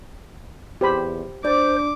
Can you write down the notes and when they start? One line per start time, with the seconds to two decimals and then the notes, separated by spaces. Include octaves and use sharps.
0.81 E2 G4 C5 B5
1.45 D4 C5 D5 D6